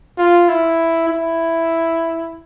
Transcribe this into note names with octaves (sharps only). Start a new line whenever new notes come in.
F4
E4
E4